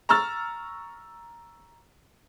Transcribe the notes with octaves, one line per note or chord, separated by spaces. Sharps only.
A#5 C#6 E6 F6 A6